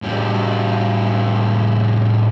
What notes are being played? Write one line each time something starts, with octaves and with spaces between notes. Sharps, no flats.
A2 G3